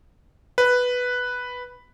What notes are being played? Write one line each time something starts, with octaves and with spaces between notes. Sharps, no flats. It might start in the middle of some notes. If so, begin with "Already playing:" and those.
B4